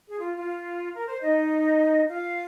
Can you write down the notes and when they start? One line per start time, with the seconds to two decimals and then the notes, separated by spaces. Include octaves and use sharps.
0.08 G#4
0.19 F4
0.37 F4
0.95 A#4
1.07 C5
1.20 D#4 D#5
2.09 F4 F5